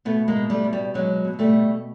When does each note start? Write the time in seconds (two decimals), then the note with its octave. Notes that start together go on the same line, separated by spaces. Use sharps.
0.05 B2 A3 B3
0.28 G#3 A#3
0.36 B2
0.50 G3 A3
0.65 B2
0.73 G3
0.94 B2 F#3 G#3
1.24 B2
1.39 G3 A3
1.53 B2